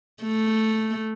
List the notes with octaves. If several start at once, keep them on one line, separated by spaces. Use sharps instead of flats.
A3